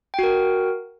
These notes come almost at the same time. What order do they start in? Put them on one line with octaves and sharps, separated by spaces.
G5 F#4 A#4